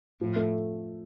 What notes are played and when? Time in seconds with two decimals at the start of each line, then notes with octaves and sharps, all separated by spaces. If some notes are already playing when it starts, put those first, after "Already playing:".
0.21 A2 F3
0.36 A3